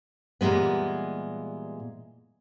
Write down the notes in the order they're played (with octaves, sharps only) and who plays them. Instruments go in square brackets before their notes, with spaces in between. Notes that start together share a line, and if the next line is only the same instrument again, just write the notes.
[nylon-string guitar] A#2 E3 G3 G#3 B3